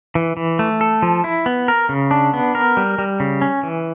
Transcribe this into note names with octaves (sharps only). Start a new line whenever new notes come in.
E3
E3
A3
A4
F3
E4
B3
A#4
C#3
D4
B3
A#4
G3
G3
C#3
C#4
E3